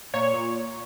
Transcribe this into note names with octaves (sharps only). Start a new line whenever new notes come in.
A#2 C#5
A#2